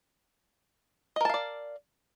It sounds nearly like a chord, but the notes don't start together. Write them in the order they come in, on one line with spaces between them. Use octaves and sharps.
D#5 A#4 A5 F5 D5